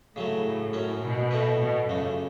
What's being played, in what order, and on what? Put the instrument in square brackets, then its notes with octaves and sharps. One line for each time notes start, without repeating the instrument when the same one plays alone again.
[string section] A2 [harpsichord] C#3 F#3 A3
[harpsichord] F#2 F#3 C#4
[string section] B2
[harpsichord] A2 A3 F#4 B4
[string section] B2
[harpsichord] C#2 C#3 A3 [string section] F#2